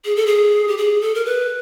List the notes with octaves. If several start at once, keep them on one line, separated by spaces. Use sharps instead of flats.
G#4
A4
G#4
G4
G#4
A4
A#4
B4